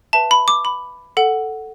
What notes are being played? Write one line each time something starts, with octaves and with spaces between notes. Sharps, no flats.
B4 E5 A5
B5
D6
B5
A4 F#5